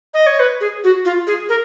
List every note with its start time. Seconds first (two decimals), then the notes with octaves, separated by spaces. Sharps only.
0.14 D#5
0.27 C#5
0.40 B4
0.61 G#4
0.84 F#4
1.05 F4
1.27 G#4
1.49 A#4